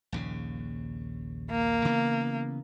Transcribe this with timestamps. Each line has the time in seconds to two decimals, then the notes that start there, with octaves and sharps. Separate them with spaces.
0.12 A#1 D#2 C#3
1.51 A#3
1.85 C#3 E3 B3